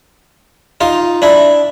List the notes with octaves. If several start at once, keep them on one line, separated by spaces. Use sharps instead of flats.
D#4 F4
D4 E4